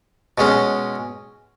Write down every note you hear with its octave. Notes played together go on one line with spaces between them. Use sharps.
B2 G#3 C#4